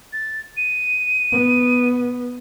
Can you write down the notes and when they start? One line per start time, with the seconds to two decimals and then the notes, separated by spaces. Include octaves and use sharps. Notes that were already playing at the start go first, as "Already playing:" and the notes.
0.13 A6
0.57 D#7
1.32 B3